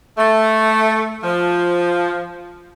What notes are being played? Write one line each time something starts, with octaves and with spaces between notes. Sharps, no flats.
A3
F3